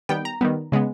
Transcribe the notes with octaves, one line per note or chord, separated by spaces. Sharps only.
D#3 G3 B3 G5
A#5
D#3 G3 B3
C#3 G#3 B3